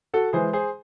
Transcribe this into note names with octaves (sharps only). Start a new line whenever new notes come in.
F#4 A4
E3 G#3 G#4 C5
G#4 C5